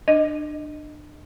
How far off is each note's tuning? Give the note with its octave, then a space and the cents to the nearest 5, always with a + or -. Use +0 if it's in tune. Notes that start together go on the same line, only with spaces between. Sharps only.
D4 +30 D#5 +0